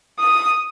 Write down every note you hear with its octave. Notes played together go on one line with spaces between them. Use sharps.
D#6